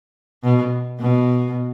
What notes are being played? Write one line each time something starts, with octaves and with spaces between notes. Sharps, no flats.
B2
B2